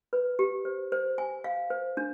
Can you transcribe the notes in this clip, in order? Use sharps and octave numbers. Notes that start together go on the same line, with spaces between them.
B4
G4
C5
C5
G#5
F5
C5
D4